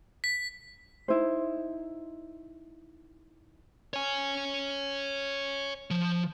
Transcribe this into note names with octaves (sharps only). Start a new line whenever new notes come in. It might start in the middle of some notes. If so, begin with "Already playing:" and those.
B6
D#4 E4 C5
C#5 G#5
F3